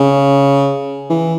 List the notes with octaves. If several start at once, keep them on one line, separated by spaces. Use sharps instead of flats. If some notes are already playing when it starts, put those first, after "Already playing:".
Already playing: C#3
E3